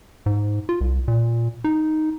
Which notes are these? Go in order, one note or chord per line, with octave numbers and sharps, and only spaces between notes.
G#2
F4
C2
A#2
D#4